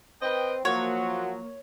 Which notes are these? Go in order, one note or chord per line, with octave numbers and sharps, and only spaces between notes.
C4 B4 D#5 G5
F3 F#3 A#3 F#4 C#5